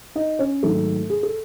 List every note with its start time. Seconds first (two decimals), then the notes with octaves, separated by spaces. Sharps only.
0.15 D#4 D#5
0.39 C#4 C#5
0.63 G#2 D#3 F#3 A3 A4
1.10 G#4
1.23 A4